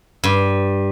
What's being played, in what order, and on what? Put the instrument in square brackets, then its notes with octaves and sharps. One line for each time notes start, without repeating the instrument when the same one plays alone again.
[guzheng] G2